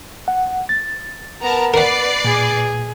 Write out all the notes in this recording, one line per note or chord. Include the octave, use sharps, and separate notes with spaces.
F#5
A6
B3 A#4 A5 A#5
A#4 B4 D5 F#5 C7
A#2 G#4